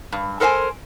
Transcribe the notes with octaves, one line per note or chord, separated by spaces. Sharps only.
G2
A4 A#4 C5 G5 G#5